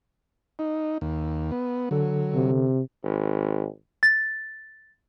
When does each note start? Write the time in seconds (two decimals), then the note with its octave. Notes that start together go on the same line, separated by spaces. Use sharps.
0.59 D#4
1.01 D#2
1.51 B3
1.91 D3 F#3 A4
2.35 C3
3.04 G#1
4.03 A6